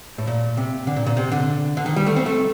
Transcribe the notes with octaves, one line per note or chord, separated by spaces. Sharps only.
A2
A#2
C3
D3
A#2
A#2
C3
D3
D3
D#3
G3
A3
C4
A3